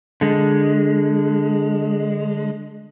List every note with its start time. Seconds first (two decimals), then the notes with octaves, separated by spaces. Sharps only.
0.21 D3 G#3